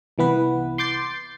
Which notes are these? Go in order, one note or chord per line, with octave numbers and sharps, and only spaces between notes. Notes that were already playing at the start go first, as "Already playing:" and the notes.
C2 E3 B3 B4
C6 D6 G6 A6 C7